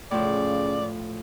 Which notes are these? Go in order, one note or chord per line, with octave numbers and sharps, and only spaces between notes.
A2 C#3 F3 D5